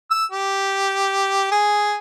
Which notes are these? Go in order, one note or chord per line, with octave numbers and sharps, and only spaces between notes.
E6
G4
G#4